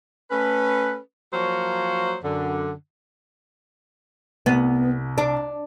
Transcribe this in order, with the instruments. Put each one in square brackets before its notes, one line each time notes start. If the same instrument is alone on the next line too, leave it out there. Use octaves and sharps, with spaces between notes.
[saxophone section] A3 C#4 A4 B4
F3 F#3 A#3 C5 C#5 F5
F#2 D3
[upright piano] C2 [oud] B3
[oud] D4